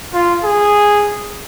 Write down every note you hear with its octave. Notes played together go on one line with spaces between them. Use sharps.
F4
G#4